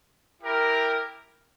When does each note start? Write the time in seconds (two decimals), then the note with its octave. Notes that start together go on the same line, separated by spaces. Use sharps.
0.42 E4 G4 A#4